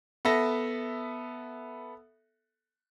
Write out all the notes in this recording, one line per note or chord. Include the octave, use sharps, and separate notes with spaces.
B3 A4 E5 A#6